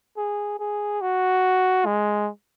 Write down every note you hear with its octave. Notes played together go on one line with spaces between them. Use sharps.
G#4
G#4
F#4
G#3